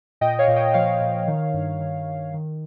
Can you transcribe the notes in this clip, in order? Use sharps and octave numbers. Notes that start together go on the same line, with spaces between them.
A#2 D#5 G5
C#5 F5
A#2
D#5 G5
F3 C#5 F5
A#2
D#3
G2
D#3
D#3
D#3